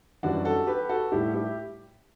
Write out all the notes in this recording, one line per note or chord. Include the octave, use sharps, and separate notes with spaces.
F#2 E3 G3 D4 F#4
F#4 A4
G4 B4
F#4 A4
A2 G3 E4 G4
E4 G4